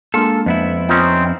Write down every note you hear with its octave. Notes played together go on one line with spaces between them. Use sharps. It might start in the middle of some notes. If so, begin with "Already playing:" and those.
G#3 A#3 D4 F4 A4
F2 B3 E4
C4 C#4 D#4 F4